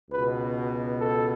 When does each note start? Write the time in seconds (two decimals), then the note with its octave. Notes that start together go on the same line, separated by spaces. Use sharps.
0.10 C#2 B2 B4
0.98 A4